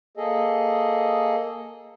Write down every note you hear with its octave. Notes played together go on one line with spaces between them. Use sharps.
A#3 G#4 A4 D#5